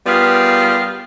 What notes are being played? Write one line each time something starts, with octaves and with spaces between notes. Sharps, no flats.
G3 B3 F4 G#4 A#4 F5